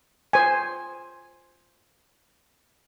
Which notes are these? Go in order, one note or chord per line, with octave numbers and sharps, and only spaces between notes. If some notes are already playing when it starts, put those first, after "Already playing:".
C5 G#5